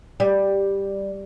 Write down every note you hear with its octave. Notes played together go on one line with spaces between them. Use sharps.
G3